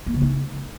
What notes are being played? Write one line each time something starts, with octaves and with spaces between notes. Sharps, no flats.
A#3
C#3
D#4